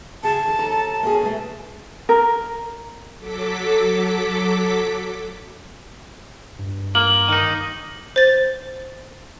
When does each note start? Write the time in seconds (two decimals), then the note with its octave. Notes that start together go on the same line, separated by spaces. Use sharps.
0.23 C#3 G#4 A5
0.45 F2 D#3
0.59 D#2 A4 A#5
1.03 A#3 C#4 G#4
1.22 B2 A3
2.09 A#4
3.19 F#3 A4 D6 B6
6.59 G2
6.95 A#3 F#7
7.28 D#3 D#4
8.16 C5 A6